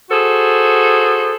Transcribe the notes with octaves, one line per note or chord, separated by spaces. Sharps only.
F#4 G#4 A4 C5